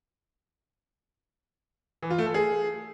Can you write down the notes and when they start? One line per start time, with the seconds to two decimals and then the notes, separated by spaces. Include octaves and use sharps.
2.03 E3
2.10 F4
2.18 A3
2.26 A4
2.34 G#4